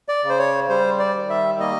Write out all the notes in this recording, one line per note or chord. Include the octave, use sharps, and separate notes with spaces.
D5
C#3
C5
C#5
G3 C5
D5
D#3
E5
A#3 D#5